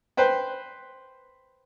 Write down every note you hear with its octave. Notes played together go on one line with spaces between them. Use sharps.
B4 C5 G5